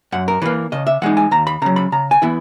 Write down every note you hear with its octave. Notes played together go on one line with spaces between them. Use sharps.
F#2 F#5
A#4
E3 A#3 B4
C#3 D#5
E5
E3 G#3 D#4 F#5
G#5
D#2 A#5
B5
C#3 F#3 A#5
B5
C#3 A#5
G#5
E3 B3 E4